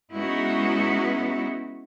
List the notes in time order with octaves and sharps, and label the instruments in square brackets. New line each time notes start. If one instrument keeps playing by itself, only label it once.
[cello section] G#3 B3 C#4 D#4 E4 F#4